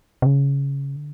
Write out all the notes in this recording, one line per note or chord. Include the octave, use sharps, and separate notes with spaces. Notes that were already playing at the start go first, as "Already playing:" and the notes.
C3
C#3
D3